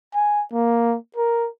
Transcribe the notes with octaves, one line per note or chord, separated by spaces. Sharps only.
G#5
A#3
A#4